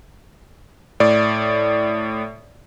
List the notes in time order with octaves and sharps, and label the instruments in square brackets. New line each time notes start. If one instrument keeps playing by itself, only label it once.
[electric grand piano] A2 D5